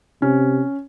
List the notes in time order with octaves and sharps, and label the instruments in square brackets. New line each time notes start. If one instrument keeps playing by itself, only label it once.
[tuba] C3 [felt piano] C#4